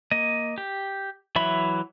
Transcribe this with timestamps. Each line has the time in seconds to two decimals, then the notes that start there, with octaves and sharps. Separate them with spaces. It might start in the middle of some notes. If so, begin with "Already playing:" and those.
0.11 A#3 D#5
0.58 G4
1.36 E3 F#3 E5 B5